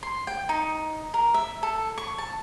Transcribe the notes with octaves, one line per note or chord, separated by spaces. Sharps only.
C6
G5
D#4
A#4
E5
A4
C#6
A5